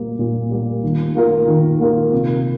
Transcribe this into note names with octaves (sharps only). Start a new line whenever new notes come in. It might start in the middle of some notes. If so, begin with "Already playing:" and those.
Already playing: A#2 G3 A#3
A#2
G3 A#3
D#3
A#3 F4 A#4
D#3
A#3 F4 A#4
C3